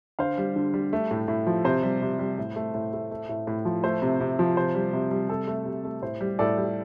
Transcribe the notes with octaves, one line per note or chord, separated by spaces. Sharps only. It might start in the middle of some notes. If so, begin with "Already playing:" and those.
D3 C5 F5
G3
D3
G3
A3
A2
A2
F3
C3 C5
G3
C3
G3
A2
A3
A2
A3
A3
A2
A2
F3
A3 C5
C3
C3
F3
C3 C5
G3
C3
G3
C3 A4
A3
C3
A3
A2 C5
G3
A2 A4 D5
G3